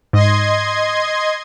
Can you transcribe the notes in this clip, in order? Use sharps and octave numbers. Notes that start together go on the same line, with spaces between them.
G#2 D#5 C6 G#6